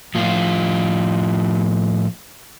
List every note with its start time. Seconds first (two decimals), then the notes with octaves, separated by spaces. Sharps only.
0.15 A2 F3 F4